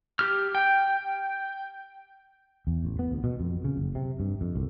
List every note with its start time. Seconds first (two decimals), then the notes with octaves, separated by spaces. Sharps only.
0.19 G4 F6
0.55 G5
2.67 E2
2.85 A1
2.99 B3
3.12 D2
3.24 B2
3.40 F2
3.64 C#3
3.77 F#1
3.95 C3
4.20 G2
4.41 F2
4.56 C2